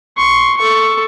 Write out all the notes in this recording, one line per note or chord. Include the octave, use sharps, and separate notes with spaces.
C6 C#6
A4 C#6